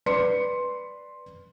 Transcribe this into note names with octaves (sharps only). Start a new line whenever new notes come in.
B4 D5 C6 C#7